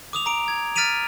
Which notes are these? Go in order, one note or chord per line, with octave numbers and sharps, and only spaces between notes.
D6 D#6 F7
A#5 D7
G#6
F6 A6 B6 D7 D#7 F7